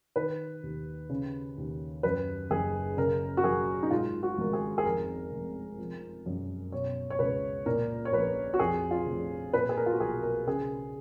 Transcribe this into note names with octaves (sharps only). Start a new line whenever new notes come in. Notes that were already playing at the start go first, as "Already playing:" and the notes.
D#3 B4
D#2
C#3
D#2
F#2 B4
F#1 G#4
C#3 A#4
F#4
F#2 G#4
D#4
G#2 F4
F#4
G#1 A#4
G#4
G#4
F2 A#4
F1
F3
F#2
B2 C#5
C#5
C#2 B4
A#2 A#4
C#5
A#1 B4
F#4
F2 G#4
F4
F1
A#2 B4
G#4
A#4
F4
F#4
B1 G#4
A#4
C#3 G#4